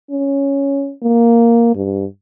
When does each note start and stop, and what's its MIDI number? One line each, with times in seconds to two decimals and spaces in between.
0.11 0.93 61
1.03 1.72 58
1.75 2.05 43